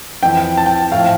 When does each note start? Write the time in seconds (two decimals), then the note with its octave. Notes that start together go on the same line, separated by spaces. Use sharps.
0.23 F2 E3 G5
0.57 A5
0.66 G5
0.92 A2 F3 F5